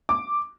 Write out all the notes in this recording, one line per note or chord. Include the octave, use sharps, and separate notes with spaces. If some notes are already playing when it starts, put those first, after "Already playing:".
D6